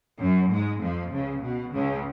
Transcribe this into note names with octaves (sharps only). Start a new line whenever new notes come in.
F#2 F#3
G#2 G#3
F2 F3
C#2 C#3
B2
C#2 C#3